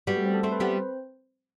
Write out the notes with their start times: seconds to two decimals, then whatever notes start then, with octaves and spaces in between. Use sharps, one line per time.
0.07 G3 B3 F#4 F#5
0.16 A3 A4
0.25 C4 C5
0.34 A4 A5
0.43 A3 C4 C5 C6
0.52 B4 B5
0.60 G3 B3 C4 C5